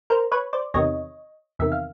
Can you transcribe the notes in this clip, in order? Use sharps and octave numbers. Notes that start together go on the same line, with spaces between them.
A#4 C5
B4 C#5
C5 D5
E2 C3 D#3 C#5 D#5
E2 C3 D#3 E5
F5